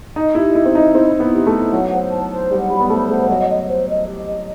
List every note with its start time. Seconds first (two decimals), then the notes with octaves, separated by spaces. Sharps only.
0.16 D#4 D#5
0.35 E4 G4
0.55 E4 D#5
0.66 C4
0.75 D#4 D#5
0.95 C4 E4
1.14 E4
1.20 B3
1.33 G4
1.46 A3
1.53 E4
1.72 F#3 F#5
1.92 C5
2.11 A5
2.31 C5
2.50 G3 F#5
2.69 G3 B5
2.80 B3
2.89 A3 C5
3.09 A3 F#5
3.29 F#3 D#5
3.49 D#5
3.67 C5
3.88 D#5
4.07 G4
4.26 D#5